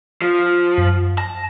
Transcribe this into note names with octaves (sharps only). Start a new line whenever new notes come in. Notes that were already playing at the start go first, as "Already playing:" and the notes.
F3
F#2
A5 A#6